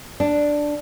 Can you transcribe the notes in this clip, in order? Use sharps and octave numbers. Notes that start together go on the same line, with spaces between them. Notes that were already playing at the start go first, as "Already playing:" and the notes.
D4